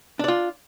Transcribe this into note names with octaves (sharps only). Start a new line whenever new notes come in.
D4 F4 D5